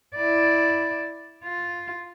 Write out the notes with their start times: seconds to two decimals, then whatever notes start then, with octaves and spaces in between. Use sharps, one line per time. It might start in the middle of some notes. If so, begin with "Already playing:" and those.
0.15 E4 D5
1.44 F4